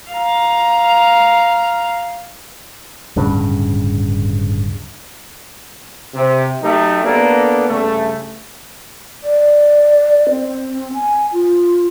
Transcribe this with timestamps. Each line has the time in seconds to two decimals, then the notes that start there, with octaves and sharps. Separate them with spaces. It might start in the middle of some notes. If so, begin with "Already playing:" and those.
0.11 F5 A#5
3.16 D1 G2 C#3
6.14 C3
6.62 F#3 A3 D#4 G4 A4
7.04 A#3 B3 D4 A4
7.69 G2 C#3 A3
9.24 D5
10.29 C4
10.93 G#5
11.32 F4